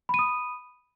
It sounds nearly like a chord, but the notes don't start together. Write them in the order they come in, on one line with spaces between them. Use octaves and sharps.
B5 D#7 D#6